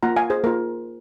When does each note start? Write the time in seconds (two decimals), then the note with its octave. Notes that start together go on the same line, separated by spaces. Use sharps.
0.03 A#3 F4 F#5 A#5
0.16 F5 G#5
0.30 G#4 C5
0.44 A#3 F4 A#4